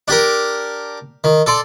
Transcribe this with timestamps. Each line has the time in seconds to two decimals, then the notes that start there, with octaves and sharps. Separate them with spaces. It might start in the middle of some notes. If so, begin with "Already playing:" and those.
0.08 D4 G4 A#4
1.24 D#3
1.46 A4 D5 C6